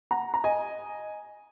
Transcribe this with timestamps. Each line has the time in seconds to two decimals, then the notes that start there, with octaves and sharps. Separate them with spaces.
0.11 F#5 A#5
0.34 A#5
0.44 D#5 G#5